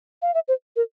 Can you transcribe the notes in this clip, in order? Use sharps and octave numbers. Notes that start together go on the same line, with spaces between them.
F5
E5
C5
A#4